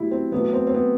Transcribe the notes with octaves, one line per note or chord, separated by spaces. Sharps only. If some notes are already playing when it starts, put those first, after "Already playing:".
Already playing: B2 F#3 A3 E4 G4
C4
B2 F#3 A3 B3
C4
C4
B3